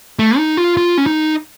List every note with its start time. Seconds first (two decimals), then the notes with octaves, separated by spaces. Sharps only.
0.19 A3
0.38 D#4
0.57 F4
0.77 F4
0.98 C#4
1.06 D#4